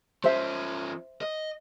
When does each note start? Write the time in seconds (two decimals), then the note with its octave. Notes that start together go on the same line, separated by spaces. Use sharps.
0.24 F3 C#4 C5 E5
1.21 D#5